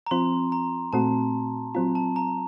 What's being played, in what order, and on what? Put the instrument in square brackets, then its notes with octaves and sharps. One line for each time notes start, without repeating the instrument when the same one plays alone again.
[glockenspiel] A#5
[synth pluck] F3 C4 F4 [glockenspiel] C6
[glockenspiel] A#5
[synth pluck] A#2 A3 C4 F#4 [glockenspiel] A5
[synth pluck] F#3 C4 F4 [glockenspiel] A#5
[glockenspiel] A5
A#5